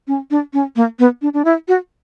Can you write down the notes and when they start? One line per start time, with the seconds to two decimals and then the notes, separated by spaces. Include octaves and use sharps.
0.07 C#4
0.31 D4
0.53 C#4
0.76 A#3
0.99 B3
1.22 D4
1.34 D4
1.45 E4
1.68 F#4